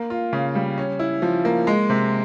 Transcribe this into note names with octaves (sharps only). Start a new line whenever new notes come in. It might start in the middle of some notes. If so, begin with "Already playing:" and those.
Already playing: A#3
F4
C#3
G3
C#4
E4
F3
A#3
G#3
C3